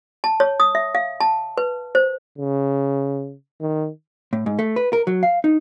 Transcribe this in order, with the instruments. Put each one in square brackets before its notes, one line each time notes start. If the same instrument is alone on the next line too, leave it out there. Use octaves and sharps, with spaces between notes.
[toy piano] A5
C#5
D#6
E5
F5
A5
B4
C5
[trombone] C#3
D#3
[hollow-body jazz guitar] A2
G#2
A3
B4
A#4
F#3
F5
D#4